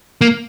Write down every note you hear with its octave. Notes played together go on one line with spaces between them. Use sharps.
A#3